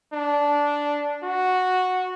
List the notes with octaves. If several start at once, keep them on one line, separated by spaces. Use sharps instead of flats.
D4
F#4